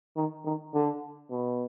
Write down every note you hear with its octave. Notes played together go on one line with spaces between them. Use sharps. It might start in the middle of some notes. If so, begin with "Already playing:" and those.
D#3
D#3
D3
B2